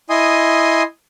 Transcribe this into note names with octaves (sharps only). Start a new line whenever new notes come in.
E4 D#5 G#5 C6 D#6